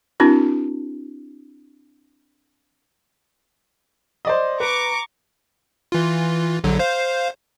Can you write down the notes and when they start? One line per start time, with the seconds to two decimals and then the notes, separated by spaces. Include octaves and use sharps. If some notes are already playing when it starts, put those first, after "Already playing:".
0.20 C4 D4 E4 F#4 A#4
4.25 C5 D5 D#5
4.60 B4 A#5 C#6 D6
5.92 E3 F4
6.64 A#1 D3 F#3
6.79 C5 F5